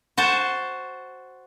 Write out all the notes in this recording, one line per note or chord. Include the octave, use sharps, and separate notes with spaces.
F#4 C5 A5